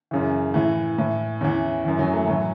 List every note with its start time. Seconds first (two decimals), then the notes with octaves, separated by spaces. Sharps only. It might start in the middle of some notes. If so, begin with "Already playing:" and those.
0.11 F#2 C#3 E3
0.54 A2 E3
0.98 A2 E3
1.41 E2 E3 C#4
1.85 F#2 E3
1.99 F#3
2.13 A3
2.27 A2 E3 F#3